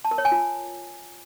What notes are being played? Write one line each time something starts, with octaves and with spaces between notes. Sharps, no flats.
A5
A#4
C#5
G#5
F4